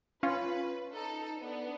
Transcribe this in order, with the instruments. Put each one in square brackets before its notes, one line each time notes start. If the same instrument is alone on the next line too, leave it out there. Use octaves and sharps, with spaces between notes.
[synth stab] C#4 F4 [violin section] B4
[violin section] D#4 A4
B3 D4